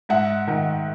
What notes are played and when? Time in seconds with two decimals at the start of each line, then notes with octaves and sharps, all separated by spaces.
0.09 G#2 E5 F#5
0.48 D#3